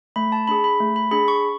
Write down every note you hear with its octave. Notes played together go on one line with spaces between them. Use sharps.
A3 B5
A5
D4 G#4 B5
B5
A3
B5
D4 G#4 B5
C#6